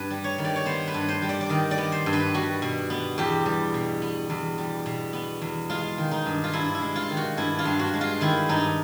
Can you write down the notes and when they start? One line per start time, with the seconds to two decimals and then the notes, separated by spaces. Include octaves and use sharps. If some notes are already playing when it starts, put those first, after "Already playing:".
Already playing: G2 B3 B4
0.10 G3
0.24 C#5
0.38 D#3
0.45 D5
0.56 C#5
0.66 B3 C5
0.88 B4
0.94 G2
1.09 C5
1.22 G3
1.29 D5
1.41 D5
1.50 D#3 D#5
1.71 D5
1.78 B3
1.92 C5
2.06 G2
2.13 B4
2.34 G3 F#4
2.62 B2
2.90 B3
3.18 E2 G4
3.46 G3
3.74 B2
4.02 B3
4.30 E2
4.58 G3
4.86 B2
5.13 B3
5.42 E2
5.70 G#3 F4
5.98 D#3
6.11 D#4
6.26 G2
6.44 F4
6.53 G2 E4
6.75 E4
6.82 G#3
6.96 F4
7.10 D#3
7.17 F#4
7.37 G2 E4
7.59 F4
7.65 G2
7.79 F#4
7.93 G#3
8.01 F4
8.21 D#3 E4
8.49 G2 D#4